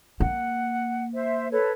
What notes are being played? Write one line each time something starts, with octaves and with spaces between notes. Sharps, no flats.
A#3 F#5
C5 E5
A4 B4 C#5